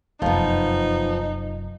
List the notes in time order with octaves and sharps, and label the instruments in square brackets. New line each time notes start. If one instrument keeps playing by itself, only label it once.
[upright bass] F1 F#2 [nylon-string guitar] F3 B3 [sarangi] D#4